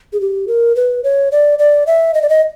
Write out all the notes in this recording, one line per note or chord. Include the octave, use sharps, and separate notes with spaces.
G#4
G4
A#4
B4
C#5
D5
D5
E5
D#5
D5
D#5